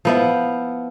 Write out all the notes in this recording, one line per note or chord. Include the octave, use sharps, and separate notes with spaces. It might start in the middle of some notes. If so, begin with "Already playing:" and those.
F3 B3 E4